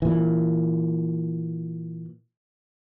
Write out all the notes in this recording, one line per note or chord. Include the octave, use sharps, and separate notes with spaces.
A#2 E3